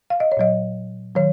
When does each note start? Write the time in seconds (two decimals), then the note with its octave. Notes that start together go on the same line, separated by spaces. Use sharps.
0.10 F5
0.20 D#5
0.32 C#5
0.37 A#2 F#3 D#5
1.16 D#3 F#3 C#5